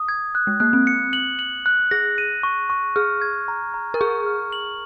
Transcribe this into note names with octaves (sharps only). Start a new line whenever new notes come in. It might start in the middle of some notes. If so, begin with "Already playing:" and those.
Already playing: D#6
G#6
F#6
G#3
A#3 F#6
C4
C#7
F#7
F#7
F#6
G#4 A#6
D#7
C#6
C#6
G#4 F6
G#6
A#5
A#5
A#4
G#4 C#6
F6
F#7